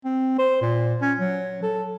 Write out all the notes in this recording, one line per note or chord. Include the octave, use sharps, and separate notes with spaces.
C4
C5
A#2
C#4
F#3
A4